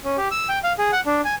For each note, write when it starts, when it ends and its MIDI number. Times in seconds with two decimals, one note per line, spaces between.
0.04 0.16 61
0.18 0.28 67
0.31 0.48 88
0.49 0.59 79
0.64 0.73 77
0.79 0.91 68
0.92 1.00 78
1.06 1.21 62
1.25 1.35 80